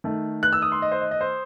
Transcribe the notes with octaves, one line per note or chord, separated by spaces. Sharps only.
D#3 A3
F#6
E6
D#6
C6
D#5
C5
D#5
D#5
C5